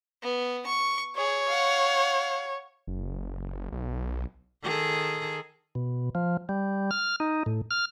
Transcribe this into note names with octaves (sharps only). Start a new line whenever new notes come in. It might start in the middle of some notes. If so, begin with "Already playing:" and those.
B3
C#6
G#4 C#5
F5 F#5
F#1
B1
D#3 G#4 A4
B2
F3
G3
F6
D#4
A2
F6